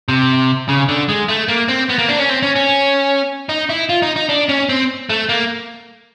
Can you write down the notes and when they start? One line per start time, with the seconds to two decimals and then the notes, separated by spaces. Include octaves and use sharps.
0.08 C3
0.69 C#3
0.89 D3
1.09 G#3
1.29 A3
1.48 A#3
1.68 C4
1.89 B3
1.98 A#3
2.09 D4
2.19 C#4
2.29 C4
2.43 C#4
2.56 C#4
3.49 D#4
3.69 E4
3.89 F4
4.02 D#4
4.16 D#4
4.29 D4
4.49 C#4
4.69 C4
5.09 A3
5.29 A#3